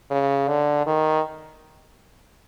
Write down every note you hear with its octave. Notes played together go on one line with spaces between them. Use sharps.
C#3
D3
D#3